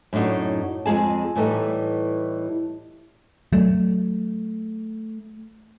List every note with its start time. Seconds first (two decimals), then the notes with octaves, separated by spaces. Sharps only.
0.13 F#2 A2 D4 D#4 F#4
0.86 F2 G#3 G#4 A5
1.36 A2 E3 G3 D#4 A4
3.53 F#3 A3